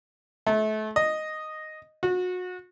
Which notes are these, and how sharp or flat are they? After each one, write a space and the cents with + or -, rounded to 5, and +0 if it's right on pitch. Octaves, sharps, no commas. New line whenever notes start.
A3 -30
D#5 -5
F#4 -30